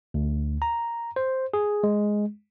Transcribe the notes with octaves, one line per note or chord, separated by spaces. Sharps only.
D2
A#5
C5
G#4
G#3